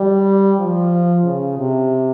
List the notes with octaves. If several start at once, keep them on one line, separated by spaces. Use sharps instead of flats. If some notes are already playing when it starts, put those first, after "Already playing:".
Already playing: G3
F3
C#3
C3